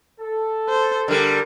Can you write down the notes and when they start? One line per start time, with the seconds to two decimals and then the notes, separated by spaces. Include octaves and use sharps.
0.20 A4
0.69 C5
1.08 D3 G3 A#4